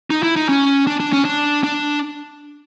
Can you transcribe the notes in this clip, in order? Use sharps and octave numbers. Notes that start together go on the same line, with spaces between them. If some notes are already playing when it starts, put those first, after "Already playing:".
D#4
E4
D#4
C#4
D4
D4
C#4
D4
D4